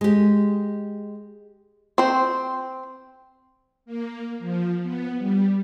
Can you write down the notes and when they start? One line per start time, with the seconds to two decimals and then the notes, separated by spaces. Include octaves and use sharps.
0.01 G#3 G4
1.98 C4 C5
3.86 A#3
4.39 F3
4.82 B3
5.17 G3